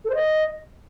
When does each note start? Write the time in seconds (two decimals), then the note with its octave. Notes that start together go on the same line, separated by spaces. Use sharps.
0.05 A4
0.10 C5
0.15 D#5